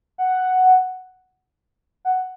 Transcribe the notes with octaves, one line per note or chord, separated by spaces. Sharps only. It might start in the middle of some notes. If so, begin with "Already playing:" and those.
F#5
F#5